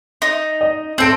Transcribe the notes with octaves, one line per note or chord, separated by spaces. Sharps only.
D#4
D#5
C4 A4 G6 D7